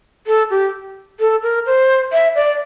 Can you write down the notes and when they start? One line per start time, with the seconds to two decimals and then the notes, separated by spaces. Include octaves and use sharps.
0.27 A4
0.50 G4
1.20 A4
1.43 A#4
1.66 C5
2.12 E5
2.35 D5